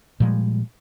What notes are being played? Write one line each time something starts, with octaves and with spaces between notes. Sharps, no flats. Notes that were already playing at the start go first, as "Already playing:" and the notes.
A#2 F3 G3 G#3